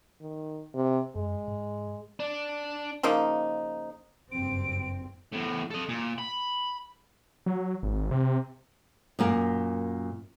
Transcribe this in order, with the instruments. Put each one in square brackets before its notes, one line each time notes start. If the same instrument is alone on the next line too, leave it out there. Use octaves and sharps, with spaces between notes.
[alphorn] D#3
C3
[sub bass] F#2 [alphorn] G#3
[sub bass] G#2
[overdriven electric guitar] D4
[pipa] C#3 F3 A#3 D#4
[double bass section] F#1 G2 C4 [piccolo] D7
[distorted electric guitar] E2 A2
A4 D#5
A#2
B5
[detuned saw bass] F#3
G#1
C3
[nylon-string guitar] F#2 A#2 A#3